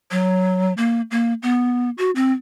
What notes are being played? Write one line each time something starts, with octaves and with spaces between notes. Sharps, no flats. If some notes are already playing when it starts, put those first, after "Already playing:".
F#3
A#3
A#3
B3
F#4
C4